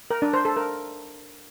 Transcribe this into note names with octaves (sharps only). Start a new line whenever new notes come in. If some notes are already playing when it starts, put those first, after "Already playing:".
A#4
D4
C5
A4
A#4